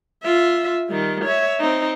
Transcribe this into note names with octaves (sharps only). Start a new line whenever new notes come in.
F4 E5
D#3 G3
C#5 E5
C4 D#4